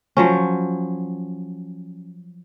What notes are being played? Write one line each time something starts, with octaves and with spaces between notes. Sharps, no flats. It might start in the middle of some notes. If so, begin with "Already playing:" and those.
F3 F#3 C#4